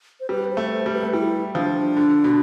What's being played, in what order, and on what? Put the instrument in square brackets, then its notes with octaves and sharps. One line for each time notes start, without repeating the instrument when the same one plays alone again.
[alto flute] C5
[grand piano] G3 [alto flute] B4
[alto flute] C5
[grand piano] A3
[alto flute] C5
[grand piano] G3
[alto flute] B4
[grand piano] A3
[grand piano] G3 [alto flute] E4
[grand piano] F3 [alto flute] D4
[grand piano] D3
B2